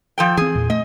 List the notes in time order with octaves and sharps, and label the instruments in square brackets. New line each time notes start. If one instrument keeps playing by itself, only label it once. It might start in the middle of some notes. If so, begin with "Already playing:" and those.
[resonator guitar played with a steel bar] F3 A4 G5
[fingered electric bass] E3 C4 [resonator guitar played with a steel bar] G#4
[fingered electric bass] E2 A#2
[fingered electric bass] A3 [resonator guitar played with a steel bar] D#5